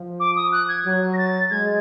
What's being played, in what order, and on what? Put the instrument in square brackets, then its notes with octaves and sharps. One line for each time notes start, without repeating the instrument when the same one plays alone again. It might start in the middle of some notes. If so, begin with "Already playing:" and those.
Already playing: [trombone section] F3
[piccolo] D6
D#6
F#6
G#6
[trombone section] F#3
[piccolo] A#6
A6
[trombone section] G#3 [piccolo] G#6